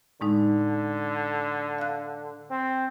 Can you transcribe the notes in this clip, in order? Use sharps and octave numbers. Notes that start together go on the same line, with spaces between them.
A2 D3 G#3 D#4
F5 F#6
C4